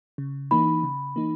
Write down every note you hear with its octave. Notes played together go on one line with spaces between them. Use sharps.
C#3
E3 A#3 D#4 B5
C#3
E3 A#3 D#4